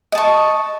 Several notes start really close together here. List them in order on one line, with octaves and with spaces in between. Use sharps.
D#5 A5 C#6